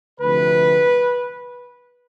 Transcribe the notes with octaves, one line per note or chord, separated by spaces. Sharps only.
D2 C3 F3 B4